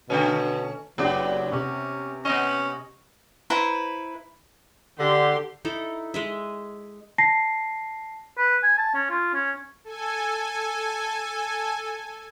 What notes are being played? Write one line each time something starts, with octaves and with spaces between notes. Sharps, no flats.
B2 D3 A3 C#4
F#1 F#3 B3 D4 G4
C3 C#4
B3 C#4 D#5
E4 B4 C5 A#5
D3 G4 C6
D#4 E4 A4 A#5
G#3 D#5 E5
A5 A#6 C7
B4
G#5
A5
C#4
F4
C#4
A4 G#5